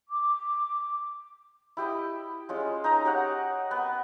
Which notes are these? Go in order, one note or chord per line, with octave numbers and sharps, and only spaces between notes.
D6
E4 G4 D#5
G#3 C#4 F4
D#4 A#5
G4 C#5 F#5
B3